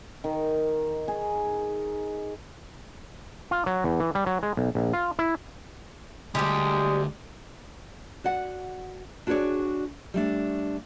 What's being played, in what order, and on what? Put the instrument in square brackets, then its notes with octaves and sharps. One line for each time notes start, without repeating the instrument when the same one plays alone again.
[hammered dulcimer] D#3
G#4
[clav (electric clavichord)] F4
F#3
E2
E3
G3
F#3
G#3
B1
A#1
F4
E4
[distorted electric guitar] D2 [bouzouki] G3 G4 [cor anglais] G#3
[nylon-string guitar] F#4 D5 F#5
D4 F#4 G#4 B4 C#5 D5
G3 A3 D4